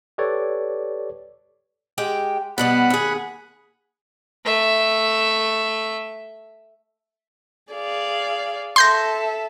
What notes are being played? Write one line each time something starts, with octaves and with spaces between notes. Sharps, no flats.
G4 A4 B4 C#5 D5
G#3 G4 G5
B2 G3 B3 F#5 B5
D#2 G#4
A3 E5
G#4 D5 F5
A4 E5 C6 G6 A#6